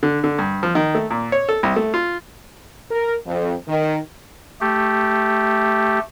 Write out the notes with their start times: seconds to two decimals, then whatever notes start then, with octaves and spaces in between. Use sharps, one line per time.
0.03 D3
0.24 D3
0.39 G2
0.63 F3
0.75 D#3
0.95 A3
1.10 A#2
1.32 C#5
1.49 A4
1.63 C2
1.76 A3
1.94 F4
2.91 A#4
3.25 F2
3.67 D#3
4.61 A3 G4